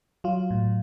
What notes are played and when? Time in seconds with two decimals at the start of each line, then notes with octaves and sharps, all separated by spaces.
0.24 F#3 F4
0.50 A2